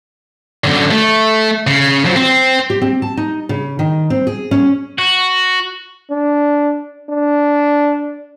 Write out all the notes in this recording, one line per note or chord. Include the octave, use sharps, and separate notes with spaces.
F#2 D3
A3
C#3
F3 F#3
C4
G4
C4
A5
D#4
C#3
D#3
C4
G#4
C#4
F#4
D4
D4